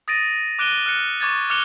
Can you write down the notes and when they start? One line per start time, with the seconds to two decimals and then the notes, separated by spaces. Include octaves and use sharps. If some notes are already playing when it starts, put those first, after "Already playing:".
0.08 D#6 A6 A#6 D7 D#7
0.59 D6 F#6 D7 D#7 G7
0.86 F6 F#6 C#7
1.21 C#6 D6 G#6 A6
1.50 D6 F6 F#6 C#7 F7 G7